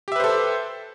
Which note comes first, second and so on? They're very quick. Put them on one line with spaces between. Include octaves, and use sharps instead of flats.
G4 E5 B4 C5 A4